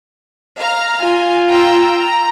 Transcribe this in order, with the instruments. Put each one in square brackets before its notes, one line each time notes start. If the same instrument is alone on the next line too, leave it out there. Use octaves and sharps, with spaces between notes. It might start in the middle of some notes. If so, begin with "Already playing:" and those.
[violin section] F5 A#5 F6
[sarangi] F4 [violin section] G#5
[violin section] G5 A#5 E6
A#5